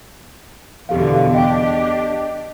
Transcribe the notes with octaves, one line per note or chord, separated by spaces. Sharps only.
E2 B2 D3 G4 A4 F5
D4 G4 D#5 G5